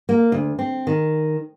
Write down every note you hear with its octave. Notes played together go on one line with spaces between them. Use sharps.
A#3
D2
C4
D#3